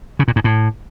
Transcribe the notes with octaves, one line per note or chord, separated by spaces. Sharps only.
C#3
A#2
G#2
A2